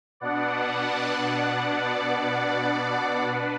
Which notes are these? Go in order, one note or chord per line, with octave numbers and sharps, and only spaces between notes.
B2 B3 D4 D5 F#5
D5
D5
D4 B4